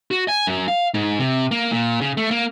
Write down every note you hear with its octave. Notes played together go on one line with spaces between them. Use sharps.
F#4
G#5
F#2
F5
G#2
C3
A#3
A#2
C#3
A3
A#3